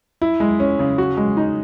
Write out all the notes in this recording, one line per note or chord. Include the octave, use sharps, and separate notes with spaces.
E4
G#3
C#4
C#3
F#4
G#3
D#4